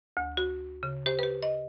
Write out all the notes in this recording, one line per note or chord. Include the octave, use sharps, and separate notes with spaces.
D2
F#4
C#3
G4 C5
G4 B4
D#5